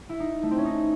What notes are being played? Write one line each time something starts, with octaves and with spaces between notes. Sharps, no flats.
E4
D#4
A3
C4
C#4
D#4